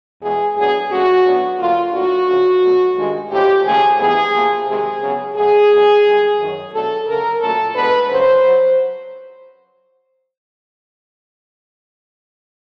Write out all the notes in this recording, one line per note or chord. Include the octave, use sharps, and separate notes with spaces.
E2 B2 G#3 G#4
A2 F#3 B3 D4 G#4
A#2 F#3 A3 C#4 F#4
A2 F#3 B3 D4
D2 D3 F#3 A#3 F4
A2 F#3 A#3 D4 F#4
D2 C#3 F3
B2 F#3 A3
G2 D#3 G#3
A2 F3 G#3 C#4 G4
D#2 C#3 F3 A3 G#4
G#2 E3 G3 B3 D4 G#4
C3 F3 A#3
C3 D#3 G#3 G#4
C#3 F#3 B3
B2 F#3 A3 G#4
E2 B2 F#3
G2 D#3 G#3
F#2 D#3 F#3
B2 F#3 A3 D4 A4
D2 C#3 F#3 A#4
A#2 F#3 A3 C#4 A4
B2 G#3 B3 D4 B4
F2 C#3 F#3 C5
F#3